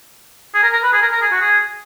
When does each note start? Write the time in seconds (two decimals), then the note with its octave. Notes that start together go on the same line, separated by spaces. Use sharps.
0.54 G#4
0.63 A#4
0.73 A#4
0.83 B4
0.93 G#4
1.02 A#4
1.12 A#4
1.21 G#4
1.32 F#4
1.41 G#4